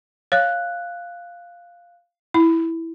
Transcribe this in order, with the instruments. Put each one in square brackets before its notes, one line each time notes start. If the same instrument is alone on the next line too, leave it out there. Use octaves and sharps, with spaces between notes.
[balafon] C#5 [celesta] F5 F#6
[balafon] E4